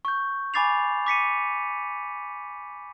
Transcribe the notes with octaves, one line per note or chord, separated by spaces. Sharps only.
C#6 G6
G#5 B5 D6 A6 C7 F7
D6 B6 C#7 D#7